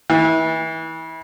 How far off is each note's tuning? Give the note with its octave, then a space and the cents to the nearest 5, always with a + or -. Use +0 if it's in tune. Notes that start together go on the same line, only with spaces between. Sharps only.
E3 -30